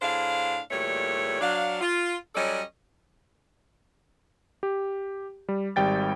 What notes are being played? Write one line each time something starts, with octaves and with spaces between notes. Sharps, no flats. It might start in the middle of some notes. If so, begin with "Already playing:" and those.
A2 D4 G#4 C5 F5
E2 A#2 G3 A3 C#5
F#3 D4 F5
F4
F#3 G3 C#4 A4 D5 D#5
G4
G3
G#1 G3 G5 A6